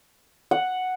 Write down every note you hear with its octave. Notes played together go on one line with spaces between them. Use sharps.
F#5